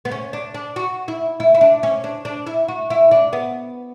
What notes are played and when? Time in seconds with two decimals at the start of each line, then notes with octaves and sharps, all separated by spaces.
0.05 B3
0.12 C#4
0.33 D4
0.54 D4
0.76 F#4
1.08 E4
1.40 E4
1.54 E4
1.61 D4
1.83 C#4
2.04 D4
2.25 D4
2.47 E4
2.68 F#4
2.90 E4
3.11 D4
3.33 B3